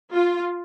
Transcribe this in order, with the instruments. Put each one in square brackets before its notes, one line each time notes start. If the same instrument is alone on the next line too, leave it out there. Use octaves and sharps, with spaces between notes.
[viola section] F4